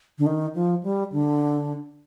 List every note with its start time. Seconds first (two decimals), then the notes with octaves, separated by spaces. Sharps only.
0.19 D3
0.26 D#3
0.55 F3
0.83 G3
1.12 D3